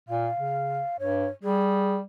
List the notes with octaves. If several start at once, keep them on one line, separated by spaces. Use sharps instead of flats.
A#2 F5
C#3
G2 C#5
G3 G#4